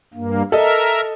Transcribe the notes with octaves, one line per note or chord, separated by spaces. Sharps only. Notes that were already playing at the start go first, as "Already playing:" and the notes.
G2 A#3
A4 A#4 D#5 E5